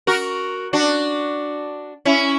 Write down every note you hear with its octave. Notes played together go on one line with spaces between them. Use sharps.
F#4 A#4
D4 F#4
C#4 E4